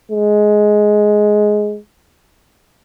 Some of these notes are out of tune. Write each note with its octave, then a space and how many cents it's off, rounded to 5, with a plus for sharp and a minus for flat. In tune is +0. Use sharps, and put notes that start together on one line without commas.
G#3 +10